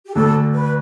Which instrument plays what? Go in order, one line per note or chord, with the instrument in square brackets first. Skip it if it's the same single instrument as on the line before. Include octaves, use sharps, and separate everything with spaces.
[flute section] G4
[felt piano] D2 D3 A3 D4 [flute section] A4
[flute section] B4